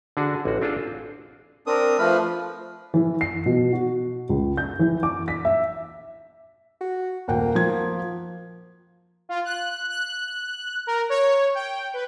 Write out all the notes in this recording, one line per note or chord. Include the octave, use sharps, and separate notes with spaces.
D3 D4 F#4 G#4
A1 F#4
C4 D4 F4 G#4 A4 C5
C4 D4 A#4 D#6
F3 A3 B4 F6
E3
C7
B2
F#4
C#2
G6
E3
D6
B6
E5
F#4
D#1 A#3 F#5 G5
F3 G#6
F4
F#6
F#6
A#4
C#5
G5
B4